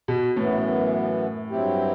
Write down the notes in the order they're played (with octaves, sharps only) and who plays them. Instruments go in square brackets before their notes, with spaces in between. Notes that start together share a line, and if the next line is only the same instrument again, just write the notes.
[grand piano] B2
[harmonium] F#2 E3 B3 [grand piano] A2
[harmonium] G2 F#3 C4 E4 G4